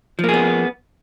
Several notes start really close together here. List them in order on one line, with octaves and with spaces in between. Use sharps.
F3 A#3 G#4 B3